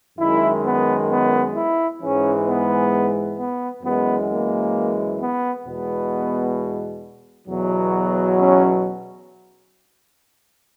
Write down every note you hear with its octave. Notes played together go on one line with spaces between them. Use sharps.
F#2 D#3 G#3 E4
B3
B3
E4
G#2 E3 G#3 C#4
B3
B3
F#2 E3 G#3 B3
A#3
B3
E2 B2 G#3 B3
E2 B2 F#3
C#4